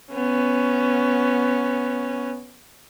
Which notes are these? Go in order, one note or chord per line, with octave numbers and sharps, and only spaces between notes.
B3 C#4